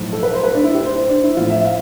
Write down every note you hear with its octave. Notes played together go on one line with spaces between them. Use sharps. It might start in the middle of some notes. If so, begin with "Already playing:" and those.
Already playing: B1 A2 F3
A4
B4
C5
B4
D4
E4
G4
C5
C5
D4
E4
A1 A2 F3 F4
E5
F5